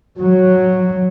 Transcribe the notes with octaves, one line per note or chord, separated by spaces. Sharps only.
F#3